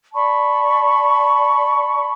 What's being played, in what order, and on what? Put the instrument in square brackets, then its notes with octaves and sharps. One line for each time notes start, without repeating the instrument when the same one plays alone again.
[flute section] D5 A5 B5 C#6